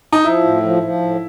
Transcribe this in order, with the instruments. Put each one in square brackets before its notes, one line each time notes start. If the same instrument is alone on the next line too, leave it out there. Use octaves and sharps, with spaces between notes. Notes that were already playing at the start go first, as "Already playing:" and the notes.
[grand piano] D#4
[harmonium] F3 [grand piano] E4
[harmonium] A2
F3
F3
A2